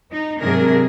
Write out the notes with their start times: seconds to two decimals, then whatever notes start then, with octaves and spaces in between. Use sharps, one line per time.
0.11 D#4
0.42 G#2 C3 F#3 D4 G#4 A#4